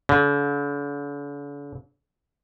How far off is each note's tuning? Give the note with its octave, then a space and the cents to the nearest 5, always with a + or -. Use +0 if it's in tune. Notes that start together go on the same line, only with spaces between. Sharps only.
D3 -45